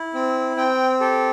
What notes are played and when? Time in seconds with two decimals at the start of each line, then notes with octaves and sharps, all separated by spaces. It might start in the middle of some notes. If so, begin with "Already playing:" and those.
Already playing: E4
0.14 C4
0.56 C4 G5
1.00 G4 A4